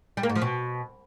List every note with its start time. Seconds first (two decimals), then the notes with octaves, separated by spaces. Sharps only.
0.17 G3
0.23 A#3
0.29 G#2
0.35 F3
0.42 B2